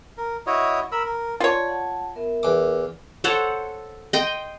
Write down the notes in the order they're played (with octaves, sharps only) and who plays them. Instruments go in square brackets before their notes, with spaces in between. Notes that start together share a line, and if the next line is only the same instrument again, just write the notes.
[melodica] A#4
E4 F#4 C#5 D#5
A#4 B5 E6
A#4
[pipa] F4 C#5 [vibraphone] D5 A5
[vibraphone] F#5 A5
B3 A#4 E5
[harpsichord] E2 D6
[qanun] A4 C5 C#5 F#5
D#5 G5 C6